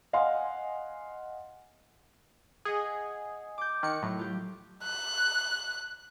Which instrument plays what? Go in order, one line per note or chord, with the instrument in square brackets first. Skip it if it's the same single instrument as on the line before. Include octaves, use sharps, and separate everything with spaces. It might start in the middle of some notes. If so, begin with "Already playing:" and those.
[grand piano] D#5 F5 F#5 G#5 C6
[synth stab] G#4 [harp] D#5 F#5
[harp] D6 G6
[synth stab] D#3 C#7 [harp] F#6
[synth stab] A2 [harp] F#3
[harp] F4 G4
[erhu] F#6